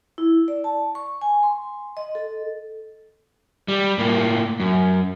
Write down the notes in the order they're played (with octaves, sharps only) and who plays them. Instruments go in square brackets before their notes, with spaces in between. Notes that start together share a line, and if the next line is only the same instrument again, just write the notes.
[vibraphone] E4
D5
A5
C#6
G#5
C6
D#5
A4
[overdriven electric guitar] G3
A2 A#3
F#2